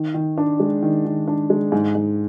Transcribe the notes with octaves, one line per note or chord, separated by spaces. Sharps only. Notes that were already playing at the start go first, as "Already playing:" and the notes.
Already playing: D#3
D#3
D4
G#3
D#3
D#3
D4
G#3
G#2
G#2